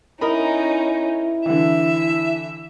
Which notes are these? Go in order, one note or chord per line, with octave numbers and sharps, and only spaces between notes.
C#4 D#4 E4 A#4 D#5 B5
D3 E3 E5